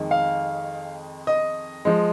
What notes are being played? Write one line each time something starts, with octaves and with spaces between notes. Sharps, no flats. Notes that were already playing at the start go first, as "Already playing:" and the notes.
Already playing: F2 D#3 G#3
F5
D#5
F3 G#3